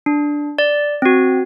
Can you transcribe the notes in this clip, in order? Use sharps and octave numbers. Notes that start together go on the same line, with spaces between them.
D4
D5
C4 F#4